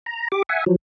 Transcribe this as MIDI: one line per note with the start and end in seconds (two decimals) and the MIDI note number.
0.06 0.28 82
0.32 0.42 67
0.32 0.42 86
0.49 0.64 76
0.49 0.64 78
0.49 0.64 80
0.66 0.76 53
0.66 0.76 54